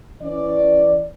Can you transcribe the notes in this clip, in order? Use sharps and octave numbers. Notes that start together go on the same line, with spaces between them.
E3 C#4 D5